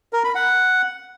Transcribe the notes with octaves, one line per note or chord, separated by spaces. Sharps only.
A#4
B5
F#5